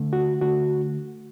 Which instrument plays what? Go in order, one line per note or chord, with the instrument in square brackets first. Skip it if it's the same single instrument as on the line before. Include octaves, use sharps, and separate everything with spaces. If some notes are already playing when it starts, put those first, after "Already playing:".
Already playing: [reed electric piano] D3 A3
F#4
D3 A3 F#4